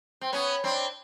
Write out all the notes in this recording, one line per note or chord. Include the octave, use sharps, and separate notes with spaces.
C4
B3 C#4
C4 D4